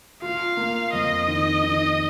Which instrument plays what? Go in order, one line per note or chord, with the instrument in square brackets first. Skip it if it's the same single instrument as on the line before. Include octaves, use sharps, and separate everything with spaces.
[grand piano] F4 [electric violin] F5
[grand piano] A#3
[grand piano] F2 [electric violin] D#5
[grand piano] D#3
D#3